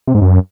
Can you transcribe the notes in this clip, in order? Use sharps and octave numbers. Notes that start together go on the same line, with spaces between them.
C3
G#2
F#2